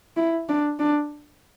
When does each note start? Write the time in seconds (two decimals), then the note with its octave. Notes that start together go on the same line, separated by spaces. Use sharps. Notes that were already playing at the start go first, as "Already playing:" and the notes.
0.17 E4
0.49 D4
0.79 D4